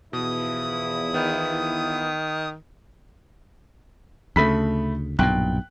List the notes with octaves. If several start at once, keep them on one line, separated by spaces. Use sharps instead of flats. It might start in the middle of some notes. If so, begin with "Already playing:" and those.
E2 B2 F3 E4 D#6
D#3 B3
D2 C#3 A3 B5 B6
B1 G2 A#2 G5 F#6